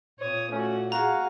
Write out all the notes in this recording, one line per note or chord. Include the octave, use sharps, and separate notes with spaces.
A#2 C#5 D#6
A3 C#4 F#4
F#4 G#4 F5 A#5